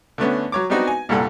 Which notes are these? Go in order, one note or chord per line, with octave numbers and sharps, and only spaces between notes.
D3 A3 B3 C#4
F#3 C#5 D6
B3 C4 D4 D#4 F#4 B4
G#5
C2 G2 A#2 A4 F#5